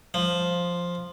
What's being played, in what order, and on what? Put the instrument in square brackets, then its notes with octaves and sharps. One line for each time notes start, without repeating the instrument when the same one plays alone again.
[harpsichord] F3